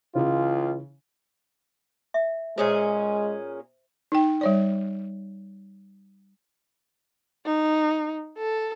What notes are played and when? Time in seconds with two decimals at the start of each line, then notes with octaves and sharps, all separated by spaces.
0.15 C#2 C#3 E3 F4
2.14 E5
2.58 A#2 G#3 C#4 G#4 C5
4.12 D#4 G5
4.41 G3 C#5 D5
7.45 D#4
8.38 A4